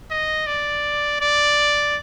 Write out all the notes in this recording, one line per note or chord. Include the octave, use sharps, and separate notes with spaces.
D#5
D5
D5